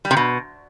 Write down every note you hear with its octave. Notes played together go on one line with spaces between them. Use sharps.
G3
C3
B2